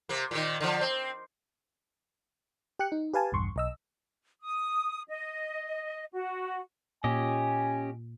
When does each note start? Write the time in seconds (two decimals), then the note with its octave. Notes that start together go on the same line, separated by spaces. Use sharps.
0.09 C3 A#3
0.31 A#2 D#3
0.61 D3 F3
0.81 C4
2.79 G4 G5 F#6 C#7
2.92 D#4
3.14 G4 B4 F5 G#5 A5
3.32 A#1 E2 G2 C6 C#6
3.56 B1 D#5 E6
4.40 D#6
5.09 D#5
6.13 F#4
7.04 A#2 C#4 G4 D#5 G#5